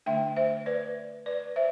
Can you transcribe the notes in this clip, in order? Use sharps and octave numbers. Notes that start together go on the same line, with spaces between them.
D3 A3 D4 E5 G5
C5 E5
B4 D5
B4 D5
C5 E5